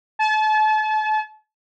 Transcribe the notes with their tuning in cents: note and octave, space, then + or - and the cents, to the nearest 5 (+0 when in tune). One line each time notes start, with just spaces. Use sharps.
A5 -35